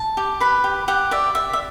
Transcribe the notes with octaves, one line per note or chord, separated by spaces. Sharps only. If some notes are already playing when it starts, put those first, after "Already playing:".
Already playing: A5
G4
B4 B5
G4
G4 F#5
D5 E5
D5 E5
E5